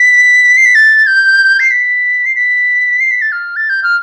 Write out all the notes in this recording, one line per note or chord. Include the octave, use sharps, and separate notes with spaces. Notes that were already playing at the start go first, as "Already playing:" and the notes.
Already playing: B6
C7
B6
A6
G6
C7
B6
C7
B6
C7
B6
A6
F6
A6
G6
F6